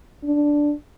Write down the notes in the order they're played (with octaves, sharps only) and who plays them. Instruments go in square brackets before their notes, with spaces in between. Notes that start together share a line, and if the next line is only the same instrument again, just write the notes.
[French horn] D4